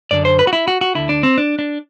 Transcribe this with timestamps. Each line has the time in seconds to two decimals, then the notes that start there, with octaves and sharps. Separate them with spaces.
0.11 F#2 D3 D5
0.25 C5
0.39 B4
0.47 F#4
0.53 E4
0.68 F#4
0.81 F#4
0.95 D2 D3 E4
1.09 D4
1.23 C4
1.38 D4
1.59 D4